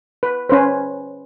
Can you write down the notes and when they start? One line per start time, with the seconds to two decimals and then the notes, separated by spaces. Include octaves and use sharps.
0.23 B4
0.49 C#4 B4 C5